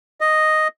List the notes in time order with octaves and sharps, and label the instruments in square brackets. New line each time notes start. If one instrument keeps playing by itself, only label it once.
[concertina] D#5